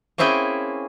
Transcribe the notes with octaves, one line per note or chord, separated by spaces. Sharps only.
A#3 C4 C#4 E4 G#4 G5